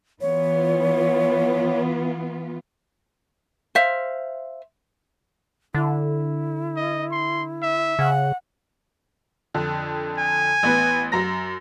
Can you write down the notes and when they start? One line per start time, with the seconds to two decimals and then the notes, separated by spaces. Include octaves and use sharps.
0.21 E3 B3 F4 C#5
3.75 C5 E5 F5
5.74 D3 E4
6.76 D#5
7.12 C6
7.62 E5
7.99 C#3 F#5
9.54 F2 D3
10.18 G#5
10.63 A1 B3 B4
11.12 F#2 A#5 A#6